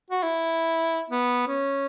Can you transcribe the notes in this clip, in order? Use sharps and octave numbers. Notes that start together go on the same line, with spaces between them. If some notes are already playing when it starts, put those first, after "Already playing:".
F#4
E4
B3
C#4